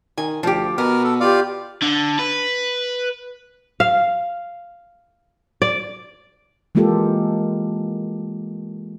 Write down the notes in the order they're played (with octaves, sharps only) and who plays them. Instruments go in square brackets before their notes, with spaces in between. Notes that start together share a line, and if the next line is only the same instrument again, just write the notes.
[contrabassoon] D#3 [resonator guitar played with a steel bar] G#5
[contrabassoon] D2 [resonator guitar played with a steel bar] F3 G4
[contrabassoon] B2 [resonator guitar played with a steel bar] B3 [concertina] A#4 F6
[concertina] A4
[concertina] F4 D5 F5 [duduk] G4
[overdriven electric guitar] D3
B4
[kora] F5
D5
[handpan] E3 G#3 A#3 F4 G4 A4